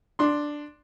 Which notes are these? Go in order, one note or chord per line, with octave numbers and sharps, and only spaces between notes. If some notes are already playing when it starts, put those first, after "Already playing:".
D4 C6